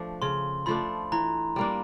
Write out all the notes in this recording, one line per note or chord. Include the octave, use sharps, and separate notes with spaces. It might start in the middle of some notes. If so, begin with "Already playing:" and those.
Already playing: F3 A3 D4
C#3 C6
F3 A3 D4 B5
E3 A#5
G3 A#3 D4